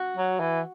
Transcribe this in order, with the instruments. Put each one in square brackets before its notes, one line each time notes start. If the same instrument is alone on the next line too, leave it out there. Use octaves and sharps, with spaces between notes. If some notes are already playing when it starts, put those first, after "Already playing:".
Already playing: [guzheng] F#4
[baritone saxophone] F#3
E3